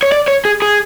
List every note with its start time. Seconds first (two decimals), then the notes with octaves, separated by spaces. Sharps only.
0.03 C#5
0.12 D5
0.28 C#5
0.45 G#4
0.62 G#4